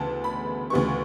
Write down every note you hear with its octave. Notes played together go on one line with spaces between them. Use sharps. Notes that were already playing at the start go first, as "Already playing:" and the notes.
Already playing: D2 C#3 E3 B3 A5
B5
D2 C#3 E3 G3 B3 C#6